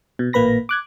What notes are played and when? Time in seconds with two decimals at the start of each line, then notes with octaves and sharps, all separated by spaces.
0.19 B2
0.33 A1 A#2 A#3 B4 B5 A#6
0.69 D6 F#6 G#6